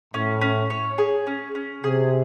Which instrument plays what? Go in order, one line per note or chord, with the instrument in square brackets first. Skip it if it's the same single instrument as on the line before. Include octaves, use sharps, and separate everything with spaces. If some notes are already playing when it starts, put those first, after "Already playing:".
[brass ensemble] A2 [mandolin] C#4
[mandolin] C#4
C#5
G#4
C#4
C#4
[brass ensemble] C3 [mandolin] G#4